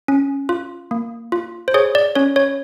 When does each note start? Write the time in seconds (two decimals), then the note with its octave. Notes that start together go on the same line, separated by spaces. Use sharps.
0.08 C#4
0.49 F4
0.91 A#3
1.32 F4
1.68 C5
1.74 G#4 C#5
1.95 D5
2.15 C#4 C#5
2.36 C#5